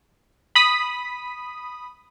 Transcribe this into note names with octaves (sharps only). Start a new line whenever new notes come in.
B5 D#6 B6